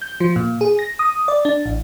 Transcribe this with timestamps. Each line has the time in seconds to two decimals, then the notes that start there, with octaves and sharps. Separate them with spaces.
0.02 G6
0.20 F3
0.36 A#2
0.61 G#4
0.79 A#6
0.99 D#6
1.28 D5
1.45 D4
1.66 A1